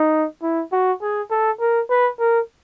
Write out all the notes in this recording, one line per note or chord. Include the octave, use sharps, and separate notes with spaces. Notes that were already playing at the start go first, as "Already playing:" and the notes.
Already playing: D#4
E4
F#4
G#4
A4
A#4
B4
A#4